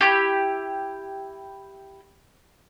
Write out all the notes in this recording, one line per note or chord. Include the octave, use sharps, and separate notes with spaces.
E4 F4 G4